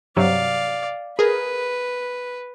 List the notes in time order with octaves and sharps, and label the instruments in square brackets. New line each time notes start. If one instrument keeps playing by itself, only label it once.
[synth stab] G2 C3 F#3 [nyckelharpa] D5 F5
[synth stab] G#4 A#4 [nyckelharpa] B4